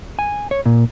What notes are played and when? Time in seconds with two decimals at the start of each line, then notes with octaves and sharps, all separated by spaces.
0.19 G#5
0.51 C#5
0.66 A#2